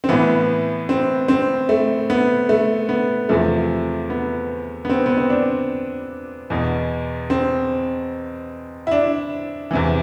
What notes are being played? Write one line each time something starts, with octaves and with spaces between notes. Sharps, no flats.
C4
A2 E3 B3
C4
C4
A3
B3
A3
B3
E2 C3 F3 A3
B3
B3
C4
B3
C4
D4
E2 B2
C4
E4
D4
E2 C3 E3